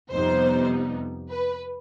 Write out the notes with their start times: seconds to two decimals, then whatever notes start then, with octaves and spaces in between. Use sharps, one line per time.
0.10 F2 C3 G3 B3 D#4 C5
1.30 B4